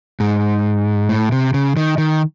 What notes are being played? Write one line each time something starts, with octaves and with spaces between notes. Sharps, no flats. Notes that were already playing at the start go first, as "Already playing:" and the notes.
G#2
A2
C3
C#3
D#3
D#3